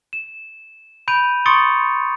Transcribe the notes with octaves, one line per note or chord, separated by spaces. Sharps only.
E7
B5 G6 D7 D#7 F7
C6 C#6 D#6 A6 C#7 D7